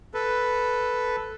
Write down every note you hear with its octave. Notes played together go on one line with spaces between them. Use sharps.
A4 B4